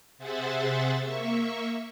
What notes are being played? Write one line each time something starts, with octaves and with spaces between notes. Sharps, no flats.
C3 G#4 C5 E5 F#5 A6
A#3 E5 C#6